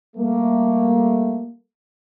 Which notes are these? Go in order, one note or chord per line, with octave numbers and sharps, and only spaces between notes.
G3 A3 A#3